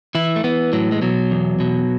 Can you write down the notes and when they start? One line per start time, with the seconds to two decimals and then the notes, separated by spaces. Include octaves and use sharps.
0.15 E3 E4
0.36 A3
0.44 E3 B3
0.73 A2 F#3
0.92 G#3
1.02 B2 F#3
1.31 E2
1.60 B2